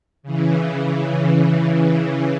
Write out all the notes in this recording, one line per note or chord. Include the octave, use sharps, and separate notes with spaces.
C#3 E3